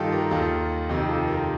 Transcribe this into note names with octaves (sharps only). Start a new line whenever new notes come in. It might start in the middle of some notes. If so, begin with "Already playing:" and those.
Already playing: G2 D#3 D#4 F4 G4 A4
G4 A#4
D#2 D#3 F4 A4
F2 C3 D#3 D#4 G4
F4 A4
G4 A#4